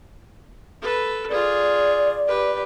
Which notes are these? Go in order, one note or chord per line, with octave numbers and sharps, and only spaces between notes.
A4 B4
F4 G#4 D5
G4 B4